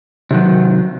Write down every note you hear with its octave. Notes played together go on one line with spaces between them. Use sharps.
C3 D#3 F#3